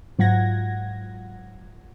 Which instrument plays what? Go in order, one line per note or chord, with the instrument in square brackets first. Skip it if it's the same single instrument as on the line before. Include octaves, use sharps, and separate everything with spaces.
[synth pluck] G#2 F#3 F4 F#5 G#6 A#6